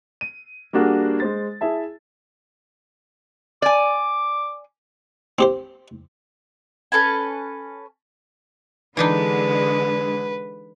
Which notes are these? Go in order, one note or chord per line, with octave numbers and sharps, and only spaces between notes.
D#7
G3 A#3 D4 F#4 G#4
G#3 C5 A6
E4 G#4 E5 A5
D5 G#5 D6
C4 G4 C5
C#4 A4 B4 G#5
D3 E3 G#3 D4 D#4 B4